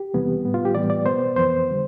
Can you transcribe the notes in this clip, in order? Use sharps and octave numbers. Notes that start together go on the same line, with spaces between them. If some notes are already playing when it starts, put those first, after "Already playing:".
Already playing: G4
E2 C3 E3 G3 B3
A2 G3 B3
F4
G4
A2 E3 G3 B3 D5
D5
B2 B3 C5
F2 E3 B3 C5
D3 G3